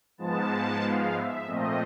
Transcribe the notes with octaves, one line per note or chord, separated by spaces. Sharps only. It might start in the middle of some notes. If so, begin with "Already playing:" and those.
G#2 F3 G#3 B3 A5
F5
E5
A#2 F3 A3 C4 D#5